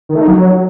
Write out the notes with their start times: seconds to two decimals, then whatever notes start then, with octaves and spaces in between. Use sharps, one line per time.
0.09 D#3
0.15 A3
0.22 D#4
0.28 F#3